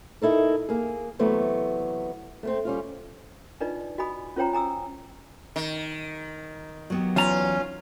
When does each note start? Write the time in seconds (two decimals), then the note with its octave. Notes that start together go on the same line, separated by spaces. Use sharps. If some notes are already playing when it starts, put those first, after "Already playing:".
0.21 D#4 E4 A4 A#4
0.69 A#3 G#4
1.19 C3 E3 F#3 A3 B3
2.43 A3 B3 C4
2.65 G3 C#4 F4
3.61 D4 D#4 F4 B4 D5 D#5
3.98 F#4 D#5 G#5 B5 D#6
4.36 C#4 F4 C5 C#5 G5 A#5
4.53 G#5 A#5 D#6 E6
5.56 D#3
6.90 F#3 B3 G4
7.16 E2 C#4 F4 A#5